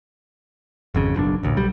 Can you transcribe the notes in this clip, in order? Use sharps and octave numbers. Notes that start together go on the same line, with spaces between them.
G#1 F2 C#3
F#1 B1 C4 D4
A1 D2 A#2
B1 G3